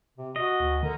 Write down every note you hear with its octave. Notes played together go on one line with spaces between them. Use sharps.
C3
F#4 D#5
D2
D3 A#4